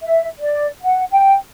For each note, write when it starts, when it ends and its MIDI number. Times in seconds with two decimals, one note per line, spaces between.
0.01 0.27 76
0.40 0.67 74
0.82 1.03 78
1.12 1.36 79